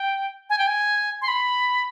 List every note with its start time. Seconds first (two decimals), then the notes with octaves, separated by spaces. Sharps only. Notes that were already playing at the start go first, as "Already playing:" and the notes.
Already playing: G5
0.50 G#5
0.58 G5
0.67 G#5
1.22 C6
1.28 B5